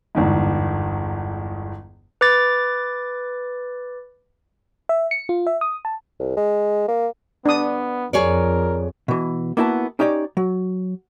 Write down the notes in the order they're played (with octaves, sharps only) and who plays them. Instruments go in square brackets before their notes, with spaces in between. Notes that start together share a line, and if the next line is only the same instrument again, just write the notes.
[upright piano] G1 E2 G#2
[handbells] B4 D6 A6
[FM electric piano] E5
C#7
F4
E5
D#6
A5
[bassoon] C2
G#3
A#3
[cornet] B3 [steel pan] D4 D#6
[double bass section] F2 [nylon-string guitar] G#4 C#5 D5 [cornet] A#4
[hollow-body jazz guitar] B2 E3
A#3 B3 E4 F#4 F#5 A5
C#4 D#4 G4 C#5 D5
F#3